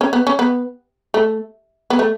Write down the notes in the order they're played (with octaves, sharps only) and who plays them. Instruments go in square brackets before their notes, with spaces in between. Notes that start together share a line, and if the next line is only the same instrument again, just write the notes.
[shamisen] C#4
B3
C#4
B3
A3
B3
A3